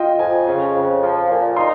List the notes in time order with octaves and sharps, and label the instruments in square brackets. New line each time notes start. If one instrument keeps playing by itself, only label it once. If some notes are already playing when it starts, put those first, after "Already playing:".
Already playing: [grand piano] F4 D#5 G5
[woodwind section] F2 [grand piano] G#5
[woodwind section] C#3
F2
F3
A#2
[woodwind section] D#4 [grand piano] C6